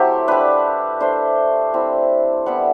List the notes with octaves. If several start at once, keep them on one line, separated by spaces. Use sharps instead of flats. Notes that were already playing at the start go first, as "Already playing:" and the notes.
Already playing: F#3 A3 C4 E4 G4 E5
G3 D4 B4
A3 D4 C5
G3 C4 E4
G3 B3 E4 F#5